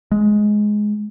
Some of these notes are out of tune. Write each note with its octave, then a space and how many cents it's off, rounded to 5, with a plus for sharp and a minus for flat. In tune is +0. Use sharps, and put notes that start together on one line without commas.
G#3 +10